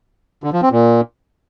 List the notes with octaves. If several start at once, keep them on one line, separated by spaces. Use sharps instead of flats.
D3
F3
C4
A#2